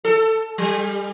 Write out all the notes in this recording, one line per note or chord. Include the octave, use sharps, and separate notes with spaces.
A4
G3